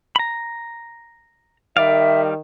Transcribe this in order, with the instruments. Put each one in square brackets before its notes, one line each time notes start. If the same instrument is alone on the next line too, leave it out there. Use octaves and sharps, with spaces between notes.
[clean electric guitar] A#5 B5
[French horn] D#3 [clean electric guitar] G3 D5 F5 [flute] E5